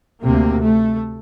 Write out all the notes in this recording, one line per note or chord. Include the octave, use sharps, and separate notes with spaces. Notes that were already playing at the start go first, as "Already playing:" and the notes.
D2 C3 A#3
A3